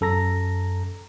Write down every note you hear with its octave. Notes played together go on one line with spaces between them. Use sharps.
F#2 A4 A#5 A#6